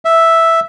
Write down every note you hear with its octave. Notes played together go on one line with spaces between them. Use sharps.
E5